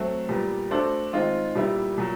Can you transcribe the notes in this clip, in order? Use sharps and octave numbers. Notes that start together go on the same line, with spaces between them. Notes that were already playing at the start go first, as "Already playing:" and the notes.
Already playing: F#3 A3 C4
A#2 G3 B3
A3 D4 F#4 A4 C5
D#3 G#3 C4 F4
A#2 G3 B3 E4
A#2 F#3